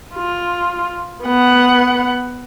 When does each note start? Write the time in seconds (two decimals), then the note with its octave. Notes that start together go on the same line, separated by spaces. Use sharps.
0.15 F4
1.24 B3 F#5